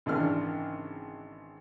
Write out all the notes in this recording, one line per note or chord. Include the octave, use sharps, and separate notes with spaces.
G#1 C#3 E3 D4 A#4 F6